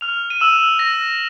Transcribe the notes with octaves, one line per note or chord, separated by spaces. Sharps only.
F6 F7
D#7
E6 E7
A#6